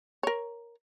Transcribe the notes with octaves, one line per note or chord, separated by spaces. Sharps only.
A#4 C#5